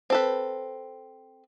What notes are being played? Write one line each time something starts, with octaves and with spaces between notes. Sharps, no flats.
C4 A4 B4